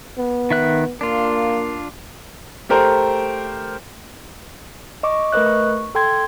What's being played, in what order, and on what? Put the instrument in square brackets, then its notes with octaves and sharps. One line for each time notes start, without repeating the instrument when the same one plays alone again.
[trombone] B3
[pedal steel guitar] D#3 E5 F#6
[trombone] A#3 [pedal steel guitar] D4 F4
[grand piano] A3 G4 A#4 C5
[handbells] D#5 C#6 D6
A3 A#4 B4 D#5 F#6
C#6
A4 G5 C6 G#6